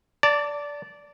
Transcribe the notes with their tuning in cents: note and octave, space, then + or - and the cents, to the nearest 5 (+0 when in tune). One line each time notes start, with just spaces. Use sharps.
D5 -15 A5 +25